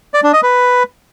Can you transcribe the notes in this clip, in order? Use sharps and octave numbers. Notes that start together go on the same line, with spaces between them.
D5
D4
D#5
B4